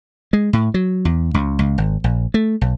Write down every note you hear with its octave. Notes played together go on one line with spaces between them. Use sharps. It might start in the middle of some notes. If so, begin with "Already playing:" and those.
G#3
A2
F#3
E2
C#2
C#2
G#1
A#1
A3
B1